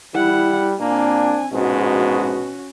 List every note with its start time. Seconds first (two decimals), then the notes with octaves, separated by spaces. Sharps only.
0.14 G3 E4 F#5
0.80 A#2 A#3 C4 D4 G#5
1.52 A#1 G#2 B2 G#3 C#4 F#4